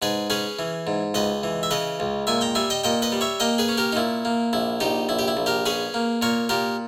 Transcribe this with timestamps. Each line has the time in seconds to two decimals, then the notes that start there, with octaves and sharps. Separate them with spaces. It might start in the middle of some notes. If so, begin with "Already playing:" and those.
0.02 G#2 G#4 B4
0.30 C#4 G#4 B4
0.59 E3
0.87 G#2
1.14 C#2 B4 D#5
1.43 E3
1.63 E5
1.71 C#3 B4 D#5
2.00 C#2
2.27 A#2 E5 G#5
2.41 G5 A#5
2.55 G3 E5 G#5
2.70 D#5 G5
2.84 A#2 D#5 G5
3.02 B4 D#5
3.12 G3
3.21 C#5 E5
3.40 A#3 D#5 G5
3.58 G#4 B4
3.69 C#4
3.77 G4 A#4
3.92 D#4
3.96 A#2 E4
4.25 A#3
4.53 A#1 E4
4.80 A#1 D#4 G4
5.09 A#1 E4
5.19 G4
5.28 E4
5.37 A#1
5.46 G4 A#4
5.66 C#4 G#4 B4
5.94 A#3
6.22 A#2 A#4 C#5
6.49 A#2 G4 A#4